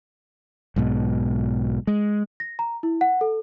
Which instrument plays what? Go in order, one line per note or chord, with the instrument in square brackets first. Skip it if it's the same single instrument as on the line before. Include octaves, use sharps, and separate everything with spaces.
[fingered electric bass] B1 G#2 B2
G#3
[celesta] A#6
A#5
E4
F#5
A4